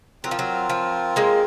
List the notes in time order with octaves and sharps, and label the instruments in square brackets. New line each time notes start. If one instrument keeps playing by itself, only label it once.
[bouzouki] F#3 [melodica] C4 F4 A#4
[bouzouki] F3
F#3
F3
G#3 A#3